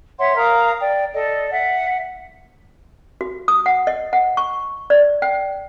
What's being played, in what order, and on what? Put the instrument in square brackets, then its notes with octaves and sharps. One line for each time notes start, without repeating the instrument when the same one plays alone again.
[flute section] C#5 E5 F#5 C6
A#4 F5 A#5 D#6
D5 G5
A4 D5 D#5
E5 F#5
[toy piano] F#4
D#6
F#5
D#5
F#5
C#6
D5
G5